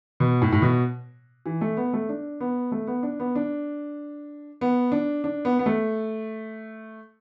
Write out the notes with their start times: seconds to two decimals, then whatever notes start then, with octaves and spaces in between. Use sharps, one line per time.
0.20 B2
0.42 A2
0.52 A2
0.62 B2
1.46 E3
1.61 A3
1.77 B3
1.93 A3
2.09 D4
2.41 B3
2.72 A3
2.87 B3
3.03 D4
3.20 B3
3.36 D4
4.61 B3
4.92 D4
5.24 D4
5.45 B3
5.59 B3
5.66 A3